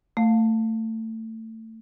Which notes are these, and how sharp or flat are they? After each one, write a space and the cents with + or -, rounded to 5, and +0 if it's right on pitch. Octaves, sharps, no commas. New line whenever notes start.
A3 +25 F5 +10